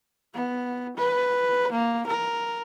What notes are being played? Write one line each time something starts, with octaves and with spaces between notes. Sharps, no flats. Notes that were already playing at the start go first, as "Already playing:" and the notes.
B3
B4
A#3
A#4